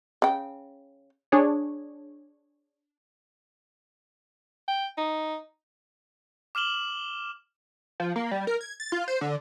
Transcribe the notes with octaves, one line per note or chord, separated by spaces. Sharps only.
C#3 G5
D4 G#4 C#5
G5
D#4
D6 F6 E7 F#7 G7
F3
A#3
G3
A#4
G#6
A6
F4
C5
D3